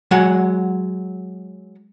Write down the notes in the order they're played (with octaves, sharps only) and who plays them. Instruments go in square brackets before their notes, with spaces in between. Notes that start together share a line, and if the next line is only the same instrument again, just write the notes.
[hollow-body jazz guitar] F#3 G#3 F#5